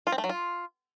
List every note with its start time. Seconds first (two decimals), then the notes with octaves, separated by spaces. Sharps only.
0.07 F4
0.12 C4
0.18 A3
0.24 F#3
0.29 F4